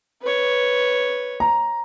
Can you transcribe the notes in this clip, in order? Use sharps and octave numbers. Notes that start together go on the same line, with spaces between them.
B4 C#5
A#5